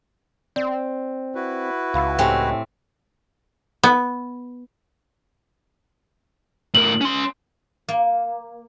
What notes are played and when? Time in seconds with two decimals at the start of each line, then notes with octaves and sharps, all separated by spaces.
0.56 C4 D5
1.35 E4 F#4 B4
1.94 C#2 F5 B5 E6
2.19 A2 C4 G4 G5 G#5
3.83 B3
6.75 A2 A#4 F#7
7.01 C#4 C6
7.88 A#3